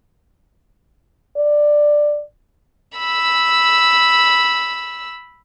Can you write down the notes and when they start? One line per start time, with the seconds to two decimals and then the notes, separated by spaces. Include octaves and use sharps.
1.37 D5
2.99 B5 E6